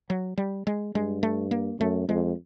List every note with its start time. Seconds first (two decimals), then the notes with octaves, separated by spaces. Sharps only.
0.10 F#3
0.38 G3
0.67 G#3
0.95 G2 G#3
1.23 A3
1.51 A#3
1.79 F#2 A3
2.08 F2 G#3